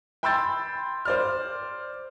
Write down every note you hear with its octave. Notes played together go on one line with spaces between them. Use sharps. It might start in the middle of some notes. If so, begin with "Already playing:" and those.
G5 B5 C6 E6 G6 A6
C5 D5 F6